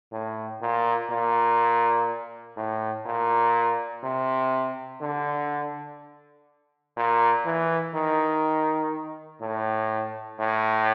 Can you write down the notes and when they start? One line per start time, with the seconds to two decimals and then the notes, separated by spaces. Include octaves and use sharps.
0.12 A2
0.62 A#2
1.10 A#2
2.57 A2
3.06 A#2
4.03 C3
5.01 D3
6.97 A#2
7.46 E3
7.95 D#3
9.42 A2
10.39 A2